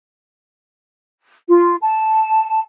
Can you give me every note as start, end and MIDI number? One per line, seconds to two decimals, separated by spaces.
1.48 1.76 65
1.81 2.61 81